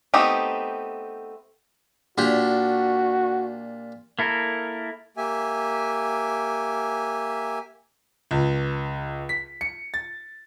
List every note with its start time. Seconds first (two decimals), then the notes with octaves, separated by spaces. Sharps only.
0.14 A3 B3 C4 D#4 G4
2.18 A#2 D4 F#4 G4
4.19 A#3 E4 A4 A#4
5.17 A#3 G4 E5 G#5
8.31 C#2
9.29 B6
9.61 C#7
9.94 A6